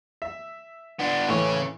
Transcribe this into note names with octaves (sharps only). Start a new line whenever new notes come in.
E5
B3 D4
A2 C#3 E3 C#5